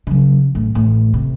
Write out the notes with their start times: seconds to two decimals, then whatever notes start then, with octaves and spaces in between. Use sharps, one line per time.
0.07 C#3 F#3
0.55 A1
0.75 A1
1.14 C3